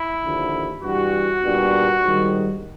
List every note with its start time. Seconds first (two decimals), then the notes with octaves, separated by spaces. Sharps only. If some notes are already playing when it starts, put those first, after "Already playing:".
Already playing: E4
0.24 D#2 D3 F3
0.83 G2 E3 G3 F#4
1.43 A#2 G3 B3 D4
2.02 A#1 G#2 D#3 G3